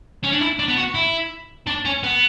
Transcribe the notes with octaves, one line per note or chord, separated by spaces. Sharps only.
C#4
D4
E4
D4
B3
F#4
E4
D4
C#4
B3